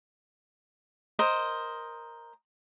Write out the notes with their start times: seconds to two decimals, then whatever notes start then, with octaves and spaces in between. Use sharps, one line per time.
1.19 A#4 C5 D#5